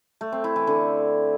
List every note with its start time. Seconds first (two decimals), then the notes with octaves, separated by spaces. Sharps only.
0.21 A3
0.32 C4
0.44 E4
0.56 E3
0.67 D3